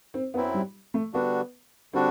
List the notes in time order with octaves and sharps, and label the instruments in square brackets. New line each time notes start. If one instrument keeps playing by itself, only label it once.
[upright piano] C4
[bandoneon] F#2 F#3 C4 E4 [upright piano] B3
[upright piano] G3
A3
[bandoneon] D3 G3 D4 F#4 [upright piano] B3
[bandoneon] D3 G3 D4 F#4 [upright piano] C4